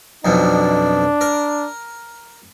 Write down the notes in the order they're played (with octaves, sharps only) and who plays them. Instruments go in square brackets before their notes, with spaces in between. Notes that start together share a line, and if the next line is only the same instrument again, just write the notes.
[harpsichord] B1 F2 B2 [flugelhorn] D4
[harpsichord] A#4